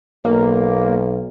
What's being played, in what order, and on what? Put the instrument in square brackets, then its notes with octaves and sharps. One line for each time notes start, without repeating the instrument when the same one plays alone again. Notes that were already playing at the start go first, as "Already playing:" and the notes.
[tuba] B1 [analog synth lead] A#3